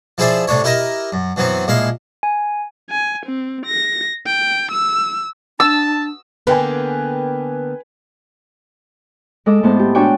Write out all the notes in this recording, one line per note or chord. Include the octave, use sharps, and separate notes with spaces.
F3 E4 G#4 C5 D5 E5
A2 C3 D4 C#5
E4 G4 A#4 D#5 E5
F#2
F#2 E3 F#3 B3 C4
A#1 G#3 E4 F5
G#5
G#5
C4
A#6
G5
E6
D4 A5 E6
D3 A#3 B3 B4 G5 G#5
G#3 A4 D#5 D6
A2 G#3 B3 C4 C5 A5
G4
D4 F#4 C#5 D5 G5 G#5